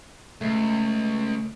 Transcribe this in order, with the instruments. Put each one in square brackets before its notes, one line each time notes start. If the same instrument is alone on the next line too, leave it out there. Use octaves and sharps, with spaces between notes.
[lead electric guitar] C#2 [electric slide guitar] A3